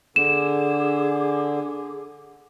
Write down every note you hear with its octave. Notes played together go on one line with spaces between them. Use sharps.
D3 G#4 D6 E7